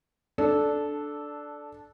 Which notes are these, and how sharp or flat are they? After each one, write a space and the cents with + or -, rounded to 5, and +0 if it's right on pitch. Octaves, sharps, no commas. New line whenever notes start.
D4 +0 A4 -10